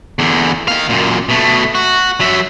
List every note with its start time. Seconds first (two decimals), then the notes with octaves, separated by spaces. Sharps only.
0.19 E2 D3
0.68 D#3 F5
0.89 F#2 A#2
1.29 B2 A3
1.75 F#4
2.20 F#3 E5